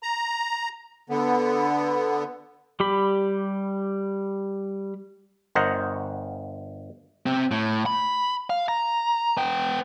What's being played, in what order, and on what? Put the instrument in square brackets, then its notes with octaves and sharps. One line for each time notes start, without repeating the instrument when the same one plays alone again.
[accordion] A#5
D3 B3
[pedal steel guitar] G3 G4 B5
[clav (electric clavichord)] G1 A#4 C5 D#5 F#5
[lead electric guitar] C3 C4
A2
B5
F5
A#5
B3 G5